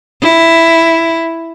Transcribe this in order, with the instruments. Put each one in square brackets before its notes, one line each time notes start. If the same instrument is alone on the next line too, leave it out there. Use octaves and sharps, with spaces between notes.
[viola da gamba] E4